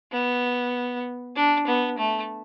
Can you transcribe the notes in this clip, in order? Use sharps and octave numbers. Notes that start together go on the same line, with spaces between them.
B3
D4
B3
A3